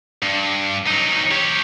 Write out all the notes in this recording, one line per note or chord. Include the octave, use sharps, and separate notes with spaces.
G2
F#3 D#4
G4 C#5